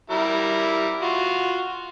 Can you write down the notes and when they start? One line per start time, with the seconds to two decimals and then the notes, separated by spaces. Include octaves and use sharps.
0.10 G3 E4 A#4
1.02 F4 F#4